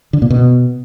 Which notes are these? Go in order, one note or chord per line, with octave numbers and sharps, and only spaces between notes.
D3
A#2
B2